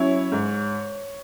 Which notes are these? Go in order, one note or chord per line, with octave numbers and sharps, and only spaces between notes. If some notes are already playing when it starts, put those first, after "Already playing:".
Already playing: F#3 C#4 E4 C#5
G#2